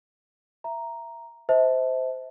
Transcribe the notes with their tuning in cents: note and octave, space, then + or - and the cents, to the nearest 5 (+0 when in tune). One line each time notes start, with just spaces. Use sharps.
E5 +15 A#5 +0
C5 -15 E5 -40 A5 -5